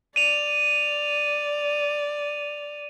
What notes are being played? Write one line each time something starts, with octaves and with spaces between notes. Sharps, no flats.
D5 D#7 F7